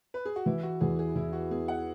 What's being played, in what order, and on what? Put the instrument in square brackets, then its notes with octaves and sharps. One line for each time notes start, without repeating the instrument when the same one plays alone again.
[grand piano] B4
G#4
F#4
[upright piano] E3 [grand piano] E4
[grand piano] F#4
[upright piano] E2 [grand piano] G#4
[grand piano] G#4
[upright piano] E2 [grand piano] E4
[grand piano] F#4
[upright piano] B3 [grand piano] G#4
[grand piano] F#5